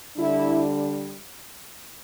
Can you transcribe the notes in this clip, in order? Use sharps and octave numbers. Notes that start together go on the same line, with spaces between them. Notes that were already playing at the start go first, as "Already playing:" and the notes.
D3 G3 D4 E4